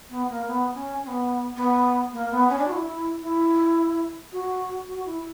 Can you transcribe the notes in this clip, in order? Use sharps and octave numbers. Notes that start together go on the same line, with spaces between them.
B3
A#3
B3
C#4
C#4
B3
B3
A#3
B3
C#4
D4
F#4
E4
E4
F#4
F#4
E4